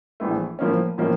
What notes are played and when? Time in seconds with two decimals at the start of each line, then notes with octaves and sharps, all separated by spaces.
0.20 A#1 A2 E3 A3
0.59 A2 F3 A#3 C#4
0.98 A2 F3 A#3 C#4